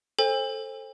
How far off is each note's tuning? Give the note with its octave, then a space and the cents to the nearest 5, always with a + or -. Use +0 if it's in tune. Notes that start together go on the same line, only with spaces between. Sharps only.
A4 +0 C5 +20 G#5 -45